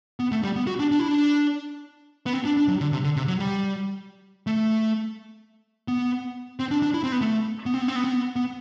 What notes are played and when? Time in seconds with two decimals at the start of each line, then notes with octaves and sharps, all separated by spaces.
0.20 B3
0.32 A3
0.44 G3
0.56 B3
0.67 F#4
0.80 D4
0.92 D4
0.99 E4
1.08 D4
2.26 B3
2.33 C4
2.45 D4
2.57 D4
2.68 F#3
2.81 D3
2.92 C3
3.04 D3
3.17 C3
3.28 F#3
3.40 G3
4.47 A3
5.88 B3
6.60 C4
6.71 D4
6.83 D4
6.94 E4
7.04 C4
7.12 B3
7.22 A3
7.66 B3
7.74 C4
7.82 B3
7.88 C4
7.96 B3
8.04 C4
8.12 B3
8.36 B3